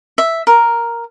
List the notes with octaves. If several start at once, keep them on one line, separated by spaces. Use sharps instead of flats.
E5
A#4